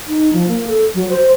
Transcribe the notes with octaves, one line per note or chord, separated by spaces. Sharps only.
D#4
F3
A#3
A4
F#3
C5